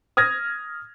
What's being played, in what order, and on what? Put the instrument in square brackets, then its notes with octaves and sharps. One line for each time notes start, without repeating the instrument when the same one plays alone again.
[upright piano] D#6 F6 G#6 A#6